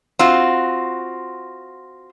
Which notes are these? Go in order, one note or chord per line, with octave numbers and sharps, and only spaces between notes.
C4 F4 F#4